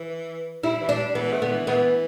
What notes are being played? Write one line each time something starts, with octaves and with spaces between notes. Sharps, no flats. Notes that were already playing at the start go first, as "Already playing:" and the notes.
Already playing: E3
G3 E4
E3
G3 D4
E3 B3
A3
D3 B3
E3
E3 B3